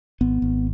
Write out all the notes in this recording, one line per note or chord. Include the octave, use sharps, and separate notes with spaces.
G#1 B3
G#1